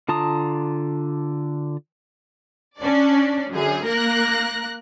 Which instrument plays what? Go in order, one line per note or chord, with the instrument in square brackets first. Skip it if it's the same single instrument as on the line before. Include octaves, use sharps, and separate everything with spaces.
[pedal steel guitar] D3 F4 A5 A#5 D#6
[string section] C#4 D4 D5
F#2 D3 G#4
A#3 A#4 F#6 A#6